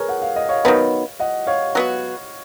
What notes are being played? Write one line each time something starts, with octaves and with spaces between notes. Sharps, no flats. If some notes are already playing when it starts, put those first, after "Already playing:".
Already playing: G#4 A#4 B4 C#5
F#5
F5
D#5
C#5 F5
D#3 F#3 B3
D#5 F#5
C#5 F5
F#3 B3 F#4